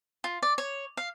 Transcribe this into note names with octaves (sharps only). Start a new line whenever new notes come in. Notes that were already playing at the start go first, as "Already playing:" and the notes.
F4
D5
C#5
F5